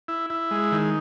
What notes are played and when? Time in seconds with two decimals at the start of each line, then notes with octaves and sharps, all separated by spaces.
0.08 E4
0.30 E4
0.51 G#3
0.72 D#3